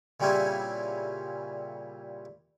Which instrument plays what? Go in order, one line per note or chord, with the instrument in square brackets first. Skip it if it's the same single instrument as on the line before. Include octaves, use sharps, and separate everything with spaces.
[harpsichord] A#2 C#3 G3 C4 C#4 E4